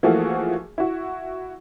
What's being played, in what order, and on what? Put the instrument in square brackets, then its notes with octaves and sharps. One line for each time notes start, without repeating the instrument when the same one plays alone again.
[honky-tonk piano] E3 F3 A3 A#3 F#4 G#4
E4 F#4